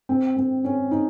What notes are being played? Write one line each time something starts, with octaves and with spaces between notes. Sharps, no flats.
C4
C4
C#4
D#4